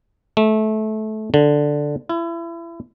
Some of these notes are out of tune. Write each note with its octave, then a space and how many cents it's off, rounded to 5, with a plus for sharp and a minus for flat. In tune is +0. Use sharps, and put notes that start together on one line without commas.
A3 -20
D3 +0
E4 +30